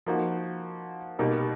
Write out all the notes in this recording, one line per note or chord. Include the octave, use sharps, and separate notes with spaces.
F3 A#3 D#4 F#4
B2 G3 A#3 D#4 G4